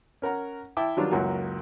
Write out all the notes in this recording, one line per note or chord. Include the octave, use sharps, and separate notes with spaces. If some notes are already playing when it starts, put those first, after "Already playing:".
C#4 A#4 F#5 A#5
E4 E5 G5 A5 D6
D#3 E3 F#3 G3 D4 F4
C#2 F#2 A#3 E4 F#4 G#5